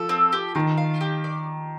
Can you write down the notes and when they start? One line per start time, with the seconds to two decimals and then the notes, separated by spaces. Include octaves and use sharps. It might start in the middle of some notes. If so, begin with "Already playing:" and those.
Already playing: F3 A4
0.09 C4
0.33 G4
0.55 D#3 F4
0.78 F5
1.01 G4
1.24 D5